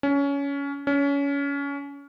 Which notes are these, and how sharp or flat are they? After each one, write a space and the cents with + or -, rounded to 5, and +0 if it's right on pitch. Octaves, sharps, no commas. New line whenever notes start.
C#4 +20
C#4 +25